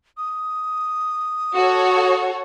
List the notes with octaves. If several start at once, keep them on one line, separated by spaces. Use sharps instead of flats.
D#6
F#4 A4 C#5